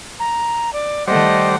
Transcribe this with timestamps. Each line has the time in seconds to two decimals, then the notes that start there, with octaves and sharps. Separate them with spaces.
0.19 A#5
0.73 D5
1.08 D#3 G3 A3 C5 D5 D#5 F#5